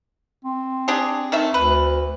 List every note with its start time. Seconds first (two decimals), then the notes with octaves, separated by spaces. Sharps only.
0.45 C4
0.88 D4 G4 G#4
1.32 D#3 A3 E5
1.54 D2 B4